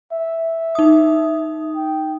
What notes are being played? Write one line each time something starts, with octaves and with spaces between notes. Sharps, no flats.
E5
D#4 D#6
G5